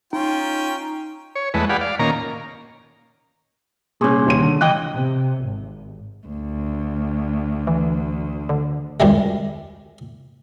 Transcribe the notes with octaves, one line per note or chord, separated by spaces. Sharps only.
C#4 D#4 F4 G5
C#5
E2 G#3 A3 B4
G4 G#4 D5 F5 F#5 B5
D5 F5
A#2 D#3 A#3 C#4 A#5
C2 A#2 C#4 G#4
D#2 C#5 D#7
D3
C#2 E3 D#5 G5 F#6
C3
G#1
D2
E3
D3
C#2 F#2 G3 G#3